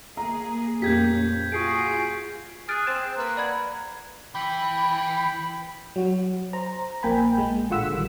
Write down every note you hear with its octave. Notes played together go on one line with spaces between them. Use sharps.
A#3 G#4 A#5
F2 A#2 A#3 C#4 G4 G6 G#6 B6
F4 F#4 G#4 C#6 C7 D7
G#4 F6 F#6 A6 D7
C4 C5 A6 E7
A#3 B4
D5 F#5 B5 G#6
E3 G5 B5
F#3 F#4
C5 A#5
A#1 A#2 A#3 G5 G#5 B5
A#2 G#3
A1 D3 F4 F#5 E6 B6
D#3 G3